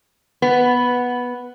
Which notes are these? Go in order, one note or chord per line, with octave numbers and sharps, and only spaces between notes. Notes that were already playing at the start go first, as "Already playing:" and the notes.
B3